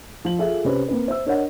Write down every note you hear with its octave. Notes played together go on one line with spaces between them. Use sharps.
F3 F#7
F4 G#4 A4 E5
C3 C#4 B4 C5
A#3 C4 B4
C5 E5 E6
D4 A#4 C#5 D#5 F#5